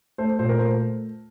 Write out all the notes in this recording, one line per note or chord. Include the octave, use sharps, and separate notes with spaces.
A3 C5
A#2 C5
A#4
A3 C5